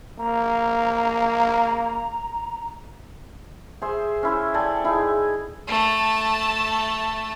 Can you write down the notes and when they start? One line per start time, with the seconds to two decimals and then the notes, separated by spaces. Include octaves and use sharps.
0.19 A#3 A#5
3.82 G#4 C5 E5
4.23 C#4 E4 C5
4.54 A4 D5 G5 G#5
4.84 D#4 E4 G#4
5.68 A3 A5